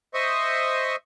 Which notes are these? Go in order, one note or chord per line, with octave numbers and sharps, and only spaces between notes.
C5 D#5 E5 C#6 D#6